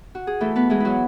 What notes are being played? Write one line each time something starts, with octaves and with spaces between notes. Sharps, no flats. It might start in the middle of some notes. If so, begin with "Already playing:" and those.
F#4
G#4
E3 A3 A4
B3 B4
E3 G#3 G#4
F#3 E4 F#4